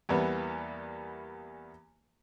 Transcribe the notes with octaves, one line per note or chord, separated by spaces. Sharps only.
E2 E3 G3 A#3 B3